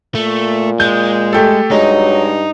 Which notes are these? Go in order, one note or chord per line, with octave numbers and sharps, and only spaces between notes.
A#2 A3
G#3 G6
A3 G4 A4
G2 F#3 G#3 D#4